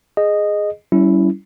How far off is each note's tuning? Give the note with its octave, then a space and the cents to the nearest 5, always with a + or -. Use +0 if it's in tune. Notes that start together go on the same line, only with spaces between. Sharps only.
G#4 +0 D#5 -10
G3 -30 C#4 +20 E4 +0